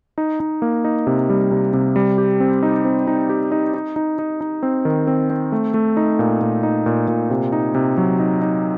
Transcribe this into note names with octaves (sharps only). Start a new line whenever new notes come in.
D#4
D#4
A#3
D#4
C3
G3
C3
C3
G3
G4
C4
D#4
C4
D#4
G4
D#4
D#4
D#4
D#4
D#4
C4
D#3
C4
C4
A3
A3
D#4
A#2
A#2
D#4
A#2
A#2
C3
D#4
C3
F#3
D#4
D#4